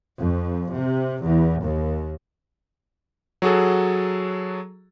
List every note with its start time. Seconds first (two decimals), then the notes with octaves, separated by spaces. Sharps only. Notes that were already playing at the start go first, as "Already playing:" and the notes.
0.20 F2
0.73 C3
1.25 E2
1.64 D#2
3.42 F#3 F#4 G#4 A4